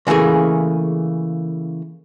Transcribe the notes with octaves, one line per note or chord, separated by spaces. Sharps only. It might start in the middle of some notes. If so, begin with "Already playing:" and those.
C#3 E3 A3 A#3 G#4